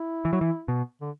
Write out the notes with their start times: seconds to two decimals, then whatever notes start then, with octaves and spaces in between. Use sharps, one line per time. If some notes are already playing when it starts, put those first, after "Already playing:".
Already playing: E4
0.25 E3
0.33 F#3
0.41 E3
0.68 B2
1.01 D3